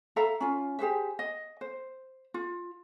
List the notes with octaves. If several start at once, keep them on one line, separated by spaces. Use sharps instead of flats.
A4 E5 F5 A#5
C#4 F4
G4 G#4 C5 E5
D#5
C5
F4